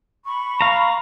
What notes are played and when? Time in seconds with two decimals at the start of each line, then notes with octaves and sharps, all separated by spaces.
0.24 B5 C#6
0.61 F5 A#5